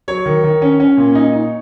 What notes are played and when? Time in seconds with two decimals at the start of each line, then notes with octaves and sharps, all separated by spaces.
0.08 F#3 C#5
0.26 D#3
0.44 D#3
0.62 C#4
0.80 C#4
0.97 A#2
1.15 D#4
1.33 D#4